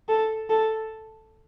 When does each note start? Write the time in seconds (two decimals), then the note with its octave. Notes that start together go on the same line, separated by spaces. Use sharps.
0.09 A4
0.50 A4